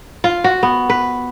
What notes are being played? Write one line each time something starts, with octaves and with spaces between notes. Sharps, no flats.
F4
F#4
B3
B4